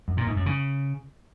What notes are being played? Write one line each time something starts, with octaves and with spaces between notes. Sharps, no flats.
F#2
A#2
G#2
F#2
C#3